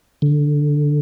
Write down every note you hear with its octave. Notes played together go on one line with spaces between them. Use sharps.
D3